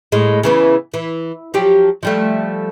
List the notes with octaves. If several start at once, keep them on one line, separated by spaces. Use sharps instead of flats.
A2 G#3
C#3 E3 B3
E3
F3 F#3 G4
F3 G3 A3